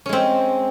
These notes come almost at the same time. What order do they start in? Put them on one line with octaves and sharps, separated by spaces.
C#4 G#3 C4